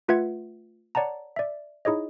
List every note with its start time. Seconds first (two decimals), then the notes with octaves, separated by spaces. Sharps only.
0.08 A3 F4 B4 E5 F#5 G#6
0.95 C#5 D5 F#5 A5 A#5
1.36 D5 E5
1.85 D#4 E4 G#4 C#5 D#5